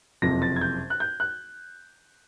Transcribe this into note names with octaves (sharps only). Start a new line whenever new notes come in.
F#1 F2 C3 A#6
A6
G#6
G6
F#6
G6
F#6